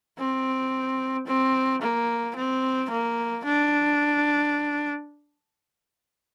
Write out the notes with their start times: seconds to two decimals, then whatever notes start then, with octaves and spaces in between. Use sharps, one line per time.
0.19 C4
1.27 C4
1.82 A#3
2.36 C4
2.90 A#3
3.44 D4